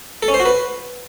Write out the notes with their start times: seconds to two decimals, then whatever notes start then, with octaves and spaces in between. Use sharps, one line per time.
0.23 A4
0.28 C#4
0.34 C5
0.40 F#4
0.46 B4